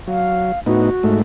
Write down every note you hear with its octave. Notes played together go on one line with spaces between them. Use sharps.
F#3 F5
A2 B3 D#4 F#4
G#2 A3